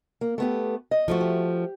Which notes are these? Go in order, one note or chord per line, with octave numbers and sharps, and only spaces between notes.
A#3
A3 B3 G4
D#5
F3 A3 F#4
G4